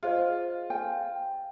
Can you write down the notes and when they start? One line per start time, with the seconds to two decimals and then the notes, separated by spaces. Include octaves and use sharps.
0.03 F4 G#4 C5 D#5
0.70 G5 G#5